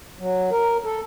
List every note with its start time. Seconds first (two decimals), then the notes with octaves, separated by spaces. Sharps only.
0.19 F#3
0.51 A#4
0.84 A4